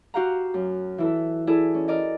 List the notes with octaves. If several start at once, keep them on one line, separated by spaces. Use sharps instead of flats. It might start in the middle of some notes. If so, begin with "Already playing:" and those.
F#4 G4 F5 F#5 A#5
F#2
E3 E4 A4
E4 G#4 A4 D5
C#4
A#4 D5 D#5